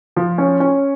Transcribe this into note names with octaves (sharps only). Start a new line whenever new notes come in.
F3
C#4
C#4